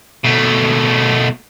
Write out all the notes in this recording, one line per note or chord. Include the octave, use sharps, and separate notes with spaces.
B2 A3